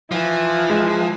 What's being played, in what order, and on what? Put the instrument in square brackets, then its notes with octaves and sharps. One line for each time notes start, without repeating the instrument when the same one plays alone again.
[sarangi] E3 [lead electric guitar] F3
[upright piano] G#3